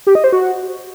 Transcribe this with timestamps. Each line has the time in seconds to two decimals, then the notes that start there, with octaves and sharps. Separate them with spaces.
0.07 G4
0.15 D#5
0.24 C5
0.32 F#4